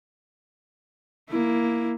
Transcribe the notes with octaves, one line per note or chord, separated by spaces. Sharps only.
A#3 E4